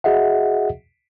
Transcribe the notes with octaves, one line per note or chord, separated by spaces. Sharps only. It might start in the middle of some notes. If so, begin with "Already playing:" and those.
F#4 G#4 D#5 E5 F#5